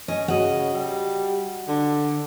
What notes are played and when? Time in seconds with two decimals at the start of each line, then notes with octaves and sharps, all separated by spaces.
0.08 C#4 D#5
0.28 C#3 F#4 D#5
0.74 G3
1.68 D3